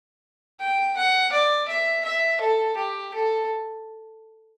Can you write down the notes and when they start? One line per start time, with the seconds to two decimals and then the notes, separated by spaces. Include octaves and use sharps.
0.60 G5
0.97 F#5
1.32 D5
1.68 E5
2.05 E5
2.41 A4
2.77 G4
3.14 A4